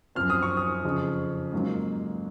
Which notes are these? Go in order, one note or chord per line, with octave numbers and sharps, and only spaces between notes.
F#2 F3 C4 F6
D#6
C#6
D#6
F2 C#3 F3
G#2 F#3 A#3 C#4 F4